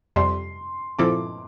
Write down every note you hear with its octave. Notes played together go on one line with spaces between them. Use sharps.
F2 C3 G3 C6
A#2 F3 C4 E4 A4 D6